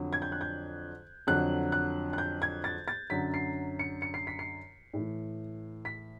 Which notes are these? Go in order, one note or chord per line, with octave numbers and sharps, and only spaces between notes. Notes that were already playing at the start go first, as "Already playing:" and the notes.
Already playing: F2 D3 F#3
G#6
G6
F#6
G6
F2 D3 F#3 F#6
F#6
F#6
G6
G#6
A6
A6
F#2 D3 F#3 B6
C7
C#7
C#7
C7
B6
C7
A2 E3
B6